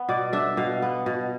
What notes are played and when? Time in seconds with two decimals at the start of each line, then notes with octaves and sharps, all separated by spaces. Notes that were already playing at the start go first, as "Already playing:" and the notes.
Already playing: B3
0.09 B2 D5
0.33 D4 E5
0.57 B2 F5
0.82 B3
1.06 B2